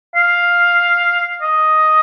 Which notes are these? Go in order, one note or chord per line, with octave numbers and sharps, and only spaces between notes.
F5
D#5